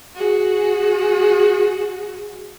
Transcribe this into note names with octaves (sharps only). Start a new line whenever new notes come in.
F#4 G#4